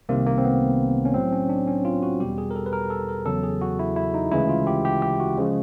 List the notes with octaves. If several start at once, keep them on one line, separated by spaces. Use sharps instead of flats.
C2 C3 D#3 A#3
A#3
C4
B3
C#4
A2 F#3 C4
C#4
D4
C#4
F4
F#4
E2 B2 G3 G4
G#4
A#4
A4
B4
A#4
A4
A#4
E2 C#3 F#3 A4
G#4
F#4
E4
E4
D#4
D2 C#3 E3 G#3 E4
F4
G4
G4
G4
F#4
C#3 F3 G#3